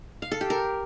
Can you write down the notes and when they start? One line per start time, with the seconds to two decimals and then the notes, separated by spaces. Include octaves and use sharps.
0.22 F5
0.31 A4
0.41 G4
0.50 A#4